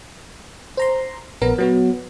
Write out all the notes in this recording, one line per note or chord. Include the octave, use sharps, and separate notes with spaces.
C5 A#5 C6
A#1 B3 A#4 A#5
F#3 B3 F#4